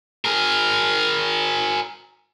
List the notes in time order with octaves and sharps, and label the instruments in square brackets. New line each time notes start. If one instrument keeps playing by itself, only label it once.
[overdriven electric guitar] G#4 A#4